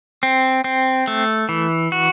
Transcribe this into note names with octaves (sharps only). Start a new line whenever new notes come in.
C4
C4
A3
E3
F#4